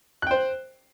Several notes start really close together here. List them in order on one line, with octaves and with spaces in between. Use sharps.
F#6 G5 C5